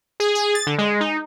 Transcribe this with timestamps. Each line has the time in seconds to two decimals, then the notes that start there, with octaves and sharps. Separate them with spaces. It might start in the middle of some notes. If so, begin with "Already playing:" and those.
0.20 G#4
0.35 G#4
0.55 A6
0.67 D3
0.78 G#3
1.01 D#4